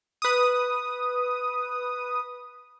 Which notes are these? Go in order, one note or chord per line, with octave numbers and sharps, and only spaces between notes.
B4 D#6